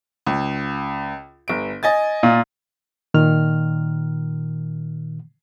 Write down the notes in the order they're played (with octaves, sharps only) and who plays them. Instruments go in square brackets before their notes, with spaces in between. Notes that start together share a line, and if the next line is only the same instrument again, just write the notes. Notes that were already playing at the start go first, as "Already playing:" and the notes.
[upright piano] C#2
G1 D7
D#5 G#5 A6
[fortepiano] A#2
[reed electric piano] A#2 D#3 F6